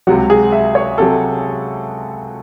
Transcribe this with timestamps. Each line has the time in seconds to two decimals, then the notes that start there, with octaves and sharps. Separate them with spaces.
0.07 C#2 C3 F#3 F#4
0.30 G#4
0.52 E5
0.75 C#5
0.98 C3 F#3 A4